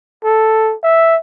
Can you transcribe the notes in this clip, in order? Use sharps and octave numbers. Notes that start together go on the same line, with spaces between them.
A4
E5